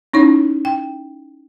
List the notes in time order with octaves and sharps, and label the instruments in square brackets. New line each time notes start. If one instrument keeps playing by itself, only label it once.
[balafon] C#4 D#4 E4 C#5
G5